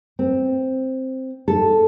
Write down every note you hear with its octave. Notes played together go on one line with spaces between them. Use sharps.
C4
A4